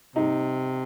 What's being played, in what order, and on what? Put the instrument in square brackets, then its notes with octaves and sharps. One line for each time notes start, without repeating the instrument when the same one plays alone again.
[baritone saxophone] C3 [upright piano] D#4